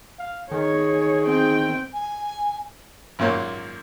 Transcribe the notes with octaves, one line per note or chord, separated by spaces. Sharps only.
F5
D#3 G#4 C#5
C4 G5
G#5
G#1 F#2 A#2 A#3 C#5